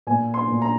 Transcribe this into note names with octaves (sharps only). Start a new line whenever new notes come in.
A#2 G#5
C6
A#2
A#5